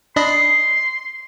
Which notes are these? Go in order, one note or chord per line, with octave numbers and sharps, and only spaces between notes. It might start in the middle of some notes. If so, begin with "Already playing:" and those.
D4 D#5 B5 C6